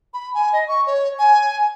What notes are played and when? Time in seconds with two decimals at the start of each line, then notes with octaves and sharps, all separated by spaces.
0.14 B5
0.34 G#5
0.53 D#5
0.68 C#6
0.87 C#5
1.19 G#5